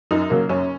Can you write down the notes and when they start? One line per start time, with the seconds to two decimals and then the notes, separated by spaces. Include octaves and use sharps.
0.11 F#2 D#4
0.30 C#3 F#3 A#3
0.49 F#2 C#4